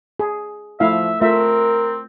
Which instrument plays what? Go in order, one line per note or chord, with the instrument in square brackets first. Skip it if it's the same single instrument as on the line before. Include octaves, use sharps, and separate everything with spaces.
[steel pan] G#4
[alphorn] F3 [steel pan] A3 E4 F5 [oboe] E5
[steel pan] A3 F4 E5 [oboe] C4 [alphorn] A#4